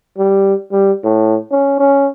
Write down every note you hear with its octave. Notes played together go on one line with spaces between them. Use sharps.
G3
G3
A2
C#4
C#4